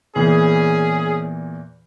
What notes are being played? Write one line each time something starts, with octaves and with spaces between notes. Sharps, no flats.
E2 A#2 E3 C#4 G#4